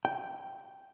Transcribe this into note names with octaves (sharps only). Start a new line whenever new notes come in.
G5